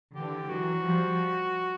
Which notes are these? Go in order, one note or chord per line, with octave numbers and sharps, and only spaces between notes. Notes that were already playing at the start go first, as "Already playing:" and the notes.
D3 E3 G4
E3 F#3 F#4
F3 G3